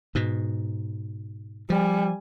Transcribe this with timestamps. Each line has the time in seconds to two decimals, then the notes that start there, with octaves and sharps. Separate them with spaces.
0.15 G#2 B2
1.70 F3 G3 G#5